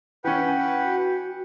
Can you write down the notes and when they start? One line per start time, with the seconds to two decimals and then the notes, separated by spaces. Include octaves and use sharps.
0.24 E3 C#4 B4 F#5 G5
0.82 F#4